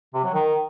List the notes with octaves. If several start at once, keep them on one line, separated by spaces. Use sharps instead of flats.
C3
F#3
D#3